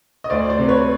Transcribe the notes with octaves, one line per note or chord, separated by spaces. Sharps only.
D#5
D2 C5 D5
C5 D5
C3
B4 C#5